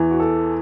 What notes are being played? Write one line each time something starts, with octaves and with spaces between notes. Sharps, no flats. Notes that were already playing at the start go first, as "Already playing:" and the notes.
Already playing: E2 E3
F#4
A4